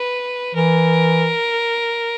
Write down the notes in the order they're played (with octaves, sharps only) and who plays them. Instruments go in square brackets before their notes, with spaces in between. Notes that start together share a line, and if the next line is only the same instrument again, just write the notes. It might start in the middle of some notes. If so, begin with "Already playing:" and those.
Already playing: [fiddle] B4
[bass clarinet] E3 [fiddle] A#4